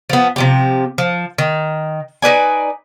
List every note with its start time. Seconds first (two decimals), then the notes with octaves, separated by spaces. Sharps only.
0.09 F3 B3
0.36 C3 F3 G4
0.98 F3
1.38 D#3
2.22 D#4 B4 D5 G#5